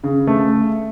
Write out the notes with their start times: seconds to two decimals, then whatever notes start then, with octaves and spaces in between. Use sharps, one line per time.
0.04 C#3
0.27 A3